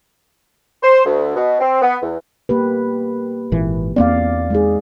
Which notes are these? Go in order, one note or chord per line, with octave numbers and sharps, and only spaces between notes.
C5
D2
B2
C4
B3
E2
A#3 G4 B4
G#1 A#2 E3
E2 A#3 C4 D5 F5
G#3 D#4 G#4